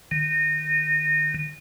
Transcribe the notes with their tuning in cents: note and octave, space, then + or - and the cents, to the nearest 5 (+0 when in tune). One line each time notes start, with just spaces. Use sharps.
D#3 -25